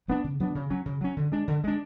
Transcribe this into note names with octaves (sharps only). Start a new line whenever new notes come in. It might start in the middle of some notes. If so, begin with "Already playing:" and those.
F#3 B3 D4
C#3
F#3 B3 D4
C#3
F#3 C#4
C#3
F#3 C#4
D3
G#3 D4
D3
G#3 D4